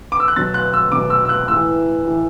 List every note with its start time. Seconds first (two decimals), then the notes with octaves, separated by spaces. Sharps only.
0.12 D6
0.20 E6
0.28 F#6
0.36 B2 F#3 A6
0.54 F#6
0.74 E6
0.92 B2 F#3 D6
1.10 E6
1.25 E6
1.29 F#6
1.48 A2 E3 E6
2.05 A2 E3